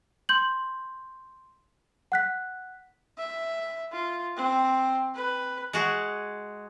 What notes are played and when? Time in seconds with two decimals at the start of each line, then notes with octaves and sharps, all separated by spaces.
0.29 C6 G6 F#7
2.12 F#5 F#6 B6
3.18 E5
3.92 F4
4.36 C4
5.15 B4
5.73 G#3 F#4 G#4